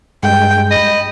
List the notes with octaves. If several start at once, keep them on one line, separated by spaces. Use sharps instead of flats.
G2 G#3 G5
D#5 B5